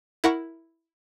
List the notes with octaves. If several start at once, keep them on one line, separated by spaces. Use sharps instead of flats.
E4 A#4 F#5 A#5 C#6